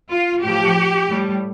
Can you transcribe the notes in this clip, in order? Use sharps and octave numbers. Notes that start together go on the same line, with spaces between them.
F4
A2 F3 G4
A2 G3